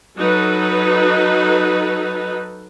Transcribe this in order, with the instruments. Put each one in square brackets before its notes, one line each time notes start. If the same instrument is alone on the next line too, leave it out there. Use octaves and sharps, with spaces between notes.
[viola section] F#3 D#4 A4 B4